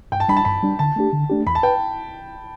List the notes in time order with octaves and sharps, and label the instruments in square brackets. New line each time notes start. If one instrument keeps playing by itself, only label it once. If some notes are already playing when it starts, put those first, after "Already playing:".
[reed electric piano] G2 [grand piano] G5
[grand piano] A5
[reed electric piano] G3 D4 [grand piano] B5
[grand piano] A5
[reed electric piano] G2 [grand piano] B5
[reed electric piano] G3 D4
[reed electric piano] D3 [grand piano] A5
[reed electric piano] A3 D4 G4
D3
A3 D4 G4
[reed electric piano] E2 [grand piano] B5
[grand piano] A5
[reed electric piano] B4 [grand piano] G5